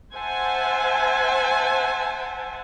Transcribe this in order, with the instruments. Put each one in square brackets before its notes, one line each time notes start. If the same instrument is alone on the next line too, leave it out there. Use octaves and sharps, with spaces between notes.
[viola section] C5 E5 F#5 G#5 A5